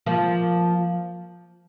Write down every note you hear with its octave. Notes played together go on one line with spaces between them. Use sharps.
F3 A#3